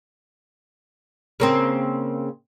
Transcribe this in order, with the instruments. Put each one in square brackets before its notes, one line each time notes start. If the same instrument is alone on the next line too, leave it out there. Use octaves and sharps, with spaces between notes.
[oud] C#3 A#3 C4